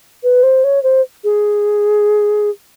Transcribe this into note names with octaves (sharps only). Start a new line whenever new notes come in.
B4
C5
C#5
C5
G#4